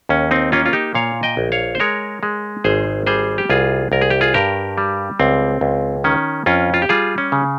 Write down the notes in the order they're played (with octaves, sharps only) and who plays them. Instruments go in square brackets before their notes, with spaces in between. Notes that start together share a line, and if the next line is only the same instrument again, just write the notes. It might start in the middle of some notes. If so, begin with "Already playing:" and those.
[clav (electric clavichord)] D#2 C#4
C4 D#4
A#3 C#4 F4
F4
D#4 G4
A#2 C#5 F5
D#5 G5
A#1
C#5 F5
C5
G#3 A#4 C#5
G#3
G#1 G#4 C5
G3 G#4 C5
G4
C2 F4 G#4
C2 A#4
G#4
G4
F4 G#4
G2 G4 A#4
G3
C#2 C4
C#2
D#3 C#4
F2 C#4 F4
F4
G4
G3 F4 G#4
C#4
C#3